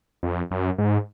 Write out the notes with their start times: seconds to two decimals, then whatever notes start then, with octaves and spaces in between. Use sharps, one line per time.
0.23 F2
0.51 F#2
0.78 G#2